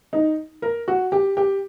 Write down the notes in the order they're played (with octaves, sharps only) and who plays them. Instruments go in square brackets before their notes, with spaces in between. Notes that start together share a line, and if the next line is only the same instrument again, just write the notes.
[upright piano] D#4
A#4
F#4
G4
G4